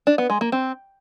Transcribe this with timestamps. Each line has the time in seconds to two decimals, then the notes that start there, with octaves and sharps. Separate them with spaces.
0.07 D4
0.18 B3
0.30 G#3
0.41 A#3
0.52 C4